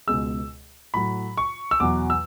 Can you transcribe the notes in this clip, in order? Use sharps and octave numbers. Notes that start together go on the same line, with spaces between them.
C#2 B2 G#3 E6
A2 F#3 B5
C#6
E6
E2 B2 F#3 D6
E6